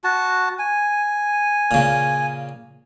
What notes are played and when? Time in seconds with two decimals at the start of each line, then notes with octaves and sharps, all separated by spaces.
0.04 F#4 A5
0.59 G#5
1.71 A#2 C#3